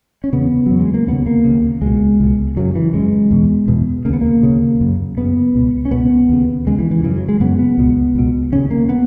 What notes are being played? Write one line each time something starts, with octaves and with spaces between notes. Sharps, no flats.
C#4
E2 C#3 B3
E2 C#3 F#3
G#3
A#3
D#2 C#3 B3
A#3
D#2 C#3
C#2 B2 G#3
C#2 B2
F#2 C#3 F#3
E3
F#2 C#3 G#3
E2 B2
E2 B2
D#2 C#3 A#3 B3
A#3
D#2 C#3
F#2 C#3
F#2 C#3 B3
C#2 B2
C#4
C#2 B2 B3
D#2 C#3
D#2 C#3 G#3
E3
E3
F#2 C#3 E3
F#3
G#3
F#2 C#3 B3
B3
C#2 B2
C#2 B2
D#2 C#3 C#4
A#3
B3